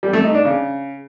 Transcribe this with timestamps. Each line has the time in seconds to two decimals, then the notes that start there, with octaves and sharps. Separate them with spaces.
0.03 G3
0.13 A3
0.24 D#4
0.35 D4
0.45 C#3